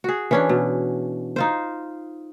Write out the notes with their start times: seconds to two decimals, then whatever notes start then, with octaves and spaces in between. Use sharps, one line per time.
0.04 F#4 G#4
0.31 E3 C#4 D4
0.49 B2
1.36 D#4 F4 C5